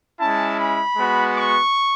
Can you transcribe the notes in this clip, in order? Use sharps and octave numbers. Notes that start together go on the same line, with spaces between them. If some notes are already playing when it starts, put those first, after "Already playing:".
G#3 C#4 E4 A5
B5
G#3 B3 F#4
C#6